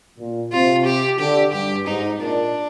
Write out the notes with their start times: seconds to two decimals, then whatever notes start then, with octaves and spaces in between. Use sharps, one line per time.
0.18 A#2
0.52 C3 F4
0.85 G4
1.19 D3 G4
1.53 G2 G4
1.86 G#2 D#4
2.20 A#2 D4